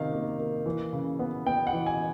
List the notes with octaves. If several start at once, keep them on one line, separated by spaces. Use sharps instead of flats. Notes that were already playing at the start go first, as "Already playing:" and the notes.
Already playing: C3 D#3 A#3 F5
A#3
A#3
E3
C#3
B3
B3 G5
F#5
E3
G#5